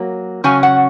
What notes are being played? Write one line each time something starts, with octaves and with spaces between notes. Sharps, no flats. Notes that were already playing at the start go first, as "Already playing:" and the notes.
Already playing: F#3 A#3
C#3 F#3 C#4 G#5
F#5